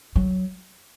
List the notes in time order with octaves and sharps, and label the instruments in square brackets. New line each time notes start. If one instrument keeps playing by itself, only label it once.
[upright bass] F#3